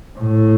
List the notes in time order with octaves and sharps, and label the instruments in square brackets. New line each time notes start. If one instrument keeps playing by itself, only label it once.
[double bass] A2